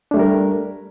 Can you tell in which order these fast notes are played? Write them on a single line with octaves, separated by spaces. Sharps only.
D4 A3 G3 A#4